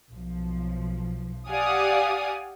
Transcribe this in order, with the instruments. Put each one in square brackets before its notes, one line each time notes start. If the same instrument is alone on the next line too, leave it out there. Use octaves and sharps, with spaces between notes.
[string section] B1 F3
G4 D5 F5 F#5 G#5 D#6